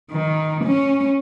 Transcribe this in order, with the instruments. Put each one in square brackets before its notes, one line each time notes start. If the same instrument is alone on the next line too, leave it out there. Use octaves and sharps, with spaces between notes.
[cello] D#3
C#4